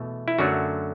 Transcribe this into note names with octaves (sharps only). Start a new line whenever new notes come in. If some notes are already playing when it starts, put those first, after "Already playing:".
Already playing: E2 B2 A3
E4
F#2 D3 F#3 A3 F#4